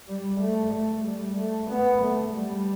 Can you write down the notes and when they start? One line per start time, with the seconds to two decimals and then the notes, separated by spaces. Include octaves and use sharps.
0.09 G3
0.41 A3
0.73 A3
1.06 G3
1.38 A3
1.71 B3
2.02 A3
2.35 G3